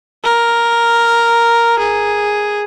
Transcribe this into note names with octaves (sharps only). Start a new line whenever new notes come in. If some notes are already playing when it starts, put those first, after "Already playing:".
A#4
G#4